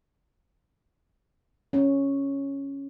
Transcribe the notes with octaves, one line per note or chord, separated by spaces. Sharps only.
C#4